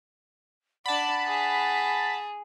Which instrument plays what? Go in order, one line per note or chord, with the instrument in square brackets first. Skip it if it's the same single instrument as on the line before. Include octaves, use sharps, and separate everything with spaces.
[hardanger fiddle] D4 D5 [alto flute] F#5 [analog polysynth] A5 B5
[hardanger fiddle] G#4